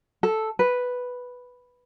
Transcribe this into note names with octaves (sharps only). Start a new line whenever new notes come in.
A4
B4